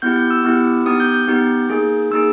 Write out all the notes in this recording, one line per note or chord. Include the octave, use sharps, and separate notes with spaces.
B3 E4 G4 G6
G6
E6
B3 E4 G4
B3 D#4 G4 D#6
G6
G6
B3 D#4 G4
A#3 D#4 G#4
A#3 D#4 G#4 E6